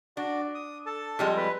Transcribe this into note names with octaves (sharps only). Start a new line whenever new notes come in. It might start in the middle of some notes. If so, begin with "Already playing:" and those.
D4 F#4 D5
D#6
A4 A5
F2 G3 G#3
B4